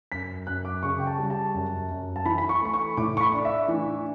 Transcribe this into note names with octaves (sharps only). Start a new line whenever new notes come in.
F#2 B6
F#2 F#6
D6
C#3 C#6
G5
A5
G3
A5
F#2
F#2
A5
E3 B5
B5
C#6
A3 B5
C#6
A2 D6
C#6
B5
D4
E5
E3